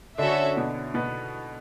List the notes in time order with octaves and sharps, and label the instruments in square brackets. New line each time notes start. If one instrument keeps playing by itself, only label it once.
[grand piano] D3 D4 [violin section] C#4 F#4 A4 C#5 E5
[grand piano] B2 B3
B2 B3